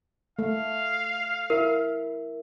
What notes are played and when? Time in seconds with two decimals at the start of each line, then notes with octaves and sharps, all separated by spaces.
0.39 A3 F5
1.50 E4 A#4 E5